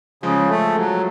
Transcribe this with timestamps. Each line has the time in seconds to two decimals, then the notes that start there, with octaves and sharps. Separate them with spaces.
0.23 C#3 F3 G#3
0.50 A3
0.76 F#3